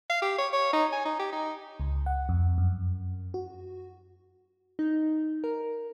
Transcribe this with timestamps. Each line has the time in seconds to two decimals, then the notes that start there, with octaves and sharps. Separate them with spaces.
0.10 F5
0.22 G4
0.39 C#5
0.53 C#5
0.73 D#4
0.92 G#5
1.05 D#4
1.19 G4
1.33 D#4
1.80 C#2
2.06 F#5
2.29 F2
2.58 F#2
3.34 F#4
4.79 D#4
5.44 A#4